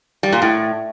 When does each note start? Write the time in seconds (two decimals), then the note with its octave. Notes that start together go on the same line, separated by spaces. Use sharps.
0.23 G3
0.32 A#2
0.42 A2